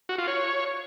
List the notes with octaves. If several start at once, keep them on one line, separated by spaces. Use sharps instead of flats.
F#4
F4
C#5